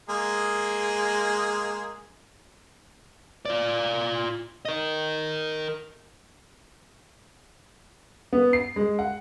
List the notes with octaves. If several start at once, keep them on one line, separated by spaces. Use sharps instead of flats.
G#3 A#3 G#4
F4 D5
A#4 D#5
B3
C7
G#3
F#5